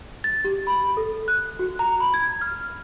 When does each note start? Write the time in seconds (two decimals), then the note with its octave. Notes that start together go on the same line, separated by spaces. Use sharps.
0.24 A6
0.45 G4
0.67 B5
0.97 A4
1.28 F#6
1.59 F#4
1.79 A#5
2.00 B5
2.14 G#6
2.41 F6